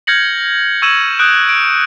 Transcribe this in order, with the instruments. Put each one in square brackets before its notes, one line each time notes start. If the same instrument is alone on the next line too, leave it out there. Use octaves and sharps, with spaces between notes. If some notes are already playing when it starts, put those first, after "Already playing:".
[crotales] F6 G6 G#6 A#6 C#7 F#7
C#6 E6 G#6 D#7 E7 F#7
D#6 F#6 G6 D7
D7